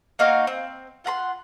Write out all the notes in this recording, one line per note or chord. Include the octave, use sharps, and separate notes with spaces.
A#3 D#4 F#4 F5
C4
F4 F#5 A#5 C6